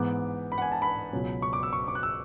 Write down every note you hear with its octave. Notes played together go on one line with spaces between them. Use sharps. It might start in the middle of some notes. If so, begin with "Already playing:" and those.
Already playing: G#2 E3 B3 D6
B5
F#5
G#5
A5
B5
C#2 B2 F#3 C#4
C#6
D6
E6
C#6
D6
F#6
E6